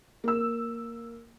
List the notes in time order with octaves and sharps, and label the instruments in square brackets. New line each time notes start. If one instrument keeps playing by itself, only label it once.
[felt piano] A#3 E6